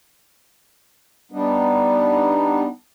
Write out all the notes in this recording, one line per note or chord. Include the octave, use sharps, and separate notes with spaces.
G3 B3 D4 D#4